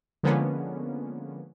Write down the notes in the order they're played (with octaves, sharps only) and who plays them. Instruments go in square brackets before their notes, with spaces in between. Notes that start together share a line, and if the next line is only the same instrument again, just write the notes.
[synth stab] D3 F3 G#3 A#3 B3 C#4